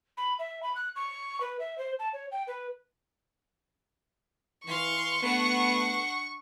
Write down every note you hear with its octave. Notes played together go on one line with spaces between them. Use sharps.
B5
E5
B5
F#6
C#6
B4
E5
C5
A5
C#5
G5
B4
E3 F5 C6 C#6
A3 B3 D4 B4 F#5